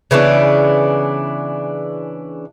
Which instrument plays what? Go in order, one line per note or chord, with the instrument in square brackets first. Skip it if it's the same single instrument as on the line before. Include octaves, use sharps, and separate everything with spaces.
[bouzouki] C#3 E3 B3 D4